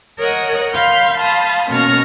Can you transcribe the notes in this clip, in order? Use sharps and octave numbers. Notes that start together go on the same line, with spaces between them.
A#4 C#5 D#5 F#5 D#6
F5 B5 C6 F6 G6
F5 A5 B5 C6 D#6
B2 A#3 C#4 C#6 F6 A#6